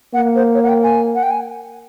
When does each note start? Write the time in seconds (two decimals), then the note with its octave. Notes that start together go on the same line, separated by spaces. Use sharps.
0.14 A#3 F#5
0.35 C5
0.55 C#5
0.64 F#5
0.69 G5
0.83 G#5
1.15 F#5
1.23 G5
1.31 G#5